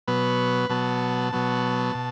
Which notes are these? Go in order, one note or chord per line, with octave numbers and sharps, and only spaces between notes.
B2 F#3 B3 B4
B2 F#3 B3 A5
B2 F#3 B3
B2